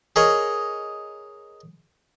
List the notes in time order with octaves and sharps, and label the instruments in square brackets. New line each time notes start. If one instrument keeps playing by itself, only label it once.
[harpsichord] G#4 A#4 C#5 D#5